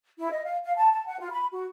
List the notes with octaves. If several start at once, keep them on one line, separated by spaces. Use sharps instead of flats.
E4
D#5
F5
F5
A5
A5
F#5
F4
B5
F#4